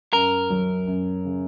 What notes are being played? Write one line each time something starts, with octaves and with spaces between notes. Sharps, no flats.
F#2 A#4
F#3
F#2
C#3